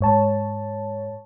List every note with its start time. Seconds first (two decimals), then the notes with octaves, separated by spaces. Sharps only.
0.01 G#2 C#5 A5